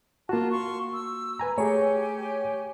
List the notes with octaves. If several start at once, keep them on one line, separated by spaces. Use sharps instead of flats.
A#3 F4 F#4 A5
F5 C6 C#6
E6
B4 G#5 A#5
A3 G4 G#4 C#5 G#5